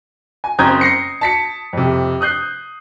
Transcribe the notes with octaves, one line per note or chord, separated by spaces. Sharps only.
G#5
F#1 C4 A#5 D#6 G6 G#6
A#6 C7 C#7
A5 B6 C#7
F2 C3
D#6 F#6 G6 C7